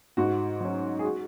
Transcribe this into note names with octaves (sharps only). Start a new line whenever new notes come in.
G#2 F#4
F#3 C#4
G#4
F#4